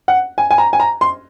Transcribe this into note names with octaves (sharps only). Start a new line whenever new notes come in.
F#5
G#5
G#5
A#5
G#5
A#5
C6